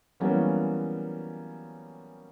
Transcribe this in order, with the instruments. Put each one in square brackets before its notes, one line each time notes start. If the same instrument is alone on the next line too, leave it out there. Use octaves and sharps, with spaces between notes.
[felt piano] E3 F#3 G3 A#3 B3 C#4